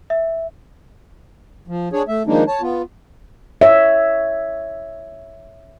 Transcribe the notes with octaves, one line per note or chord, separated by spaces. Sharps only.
E5
F3
D4 G#4 C#5
A3 E5
D#3 F3 G#3 A#3 D4 D#4
C#5 A5
B3 F4
C#5 E5